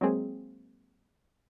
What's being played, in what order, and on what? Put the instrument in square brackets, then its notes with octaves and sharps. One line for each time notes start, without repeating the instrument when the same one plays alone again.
[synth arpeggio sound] F#3 G#3 A#3 C4 G#4